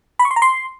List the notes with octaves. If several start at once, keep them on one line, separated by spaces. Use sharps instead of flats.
B5
C#6
C6
A#5
C6